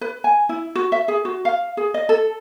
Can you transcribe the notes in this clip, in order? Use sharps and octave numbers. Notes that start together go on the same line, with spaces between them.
B4
G#5
E4
F#4
E5
G#4
F#4
F5
G#4
D#5
A4